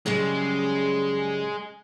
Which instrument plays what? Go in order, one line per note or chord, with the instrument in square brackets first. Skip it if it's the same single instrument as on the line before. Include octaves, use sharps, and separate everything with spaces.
[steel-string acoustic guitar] F#2 C#3 G3 [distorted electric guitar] G#3